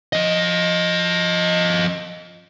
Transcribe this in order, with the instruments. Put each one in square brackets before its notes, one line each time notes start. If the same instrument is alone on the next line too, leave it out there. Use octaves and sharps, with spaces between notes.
[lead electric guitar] F3 D#5